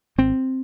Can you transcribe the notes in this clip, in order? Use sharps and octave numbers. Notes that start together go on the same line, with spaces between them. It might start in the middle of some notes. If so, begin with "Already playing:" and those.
G#1 C4